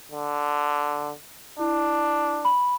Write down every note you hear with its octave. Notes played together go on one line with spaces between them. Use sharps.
D3
D4 E4
B5